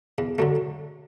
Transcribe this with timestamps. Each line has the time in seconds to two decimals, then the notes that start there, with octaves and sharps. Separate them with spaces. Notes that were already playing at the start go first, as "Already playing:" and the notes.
0.18 E2
0.38 D3 F#3 A3